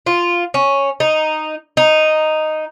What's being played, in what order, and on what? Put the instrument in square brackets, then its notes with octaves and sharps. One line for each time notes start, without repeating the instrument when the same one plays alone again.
[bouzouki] F4
C#4
D#4
D#4